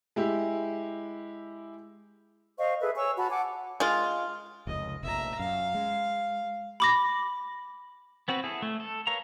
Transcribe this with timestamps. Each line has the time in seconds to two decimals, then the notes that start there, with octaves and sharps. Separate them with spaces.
0.16 G#3 E4 G4
2.58 C5 D#5 F5 C#6
2.81 G#4 A4 B4 E5
2.97 C#5 G#5 C#6 E6
3.17 F#4 A5 B5
3.30 F#5 G#5 A5 D6
3.80 G#3 F4
4.67 F1 C#2 D#5
5.03 F1 A#1 E5 A#5
5.39 F#2 F5
5.75 G#3
6.80 B5 D6 A#6
8.28 B3 C4 F#4 B4
8.44 E4 G#4 A4
8.62 A3
8.80 A4
9.07 A#4 B4 C#5 F5 A#5